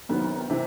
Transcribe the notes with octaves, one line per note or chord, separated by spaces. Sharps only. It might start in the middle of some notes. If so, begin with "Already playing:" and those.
C2 C3 D#3 F#3 B3
C3 E3